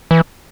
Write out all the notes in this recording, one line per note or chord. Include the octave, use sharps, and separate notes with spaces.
E3